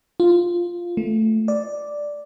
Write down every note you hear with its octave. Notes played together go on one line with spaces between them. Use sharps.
F4
A3
D5